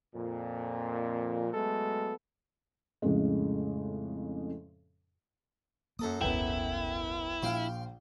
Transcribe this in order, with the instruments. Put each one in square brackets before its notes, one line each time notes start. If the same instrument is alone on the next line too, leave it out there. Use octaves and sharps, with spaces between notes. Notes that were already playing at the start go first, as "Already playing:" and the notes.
[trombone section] F2 A#2
F#3 G#3 A3 B3 A4
[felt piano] F2 A2 C#3 G#3
[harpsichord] F#2 A4 D#6 [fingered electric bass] A#3
[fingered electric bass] D#1 G#1 D#2 [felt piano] B3 B4 G5 [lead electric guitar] E4
[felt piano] A#1 [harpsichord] F5 G5 C6